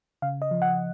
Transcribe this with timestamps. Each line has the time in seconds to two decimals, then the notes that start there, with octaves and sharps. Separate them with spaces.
0.22 C#3 F5
0.42 D#5
0.51 F3
0.62 F#5